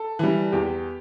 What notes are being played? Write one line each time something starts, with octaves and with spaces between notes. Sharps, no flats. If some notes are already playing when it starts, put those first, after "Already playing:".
Already playing: A4
E3 G3
E2 G4